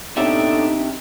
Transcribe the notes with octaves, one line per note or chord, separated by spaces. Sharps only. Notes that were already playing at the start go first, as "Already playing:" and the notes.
A2 B3 C4 D4 D#4 G4 D5 E5